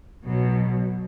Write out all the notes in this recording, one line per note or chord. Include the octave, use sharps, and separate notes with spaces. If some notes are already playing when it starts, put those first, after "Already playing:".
B1 B2 F#3